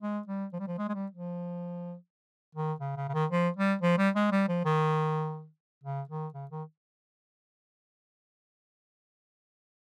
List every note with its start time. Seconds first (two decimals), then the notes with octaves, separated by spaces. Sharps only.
0.02 G#3
0.28 G3
0.53 F3
0.60 G3
0.68 F3
0.78 G#3
0.89 G#3
0.94 G3
1.12 F3
2.55 D#3
2.80 C#3
2.96 C#3
3.09 C#3
3.14 D#3
3.31 F3
3.57 G3
3.82 F3
3.97 G3
4.15 G#3
4.32 G3
4.48 F3
4.65 D#3
5.84 C#3
6.09 D#3
6.34 C#3
6.51 D#3